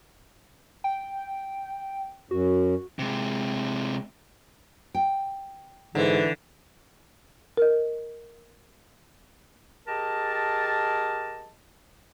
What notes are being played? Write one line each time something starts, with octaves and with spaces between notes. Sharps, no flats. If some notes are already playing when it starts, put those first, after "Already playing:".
G5
F#2 F#4
C3 G#3
G5
G#2 D3 E3
A#4 D#5
G4 G#4 A#4 D#5 A5